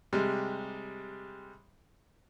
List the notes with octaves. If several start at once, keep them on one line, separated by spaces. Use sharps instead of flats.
C3 G3 G#3